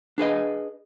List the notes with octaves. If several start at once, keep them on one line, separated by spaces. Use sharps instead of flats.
D4 G#4 B4 D#5